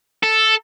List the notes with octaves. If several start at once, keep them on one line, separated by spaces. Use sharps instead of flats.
A4